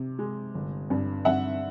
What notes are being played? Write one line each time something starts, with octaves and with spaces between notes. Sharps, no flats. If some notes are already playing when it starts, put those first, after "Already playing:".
Already playing: C3
G#3
G1
G2
G2 E5 F#5